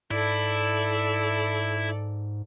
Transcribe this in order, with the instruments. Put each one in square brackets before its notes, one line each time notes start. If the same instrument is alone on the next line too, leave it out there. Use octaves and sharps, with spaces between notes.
[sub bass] G#2 [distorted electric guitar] E4 [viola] A4 D5